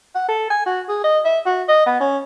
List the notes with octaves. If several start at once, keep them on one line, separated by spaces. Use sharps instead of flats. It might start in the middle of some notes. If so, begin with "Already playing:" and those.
F#5
A4
G#5
F#4
G#4
D#5
E5
F#4
D#5
B3
C#4